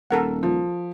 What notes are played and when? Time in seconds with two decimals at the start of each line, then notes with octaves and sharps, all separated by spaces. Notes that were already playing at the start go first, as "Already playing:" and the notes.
0.11 D#1 A4 A#4 F#5
0.43 F3